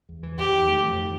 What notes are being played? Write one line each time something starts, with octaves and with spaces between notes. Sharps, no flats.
E2
E3
E2 G4
D#3
A3
F2
D#3